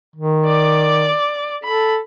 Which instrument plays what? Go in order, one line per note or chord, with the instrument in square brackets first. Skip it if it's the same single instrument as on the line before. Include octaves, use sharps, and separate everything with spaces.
[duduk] D#3
[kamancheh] D5 D6
[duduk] A4 [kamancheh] B5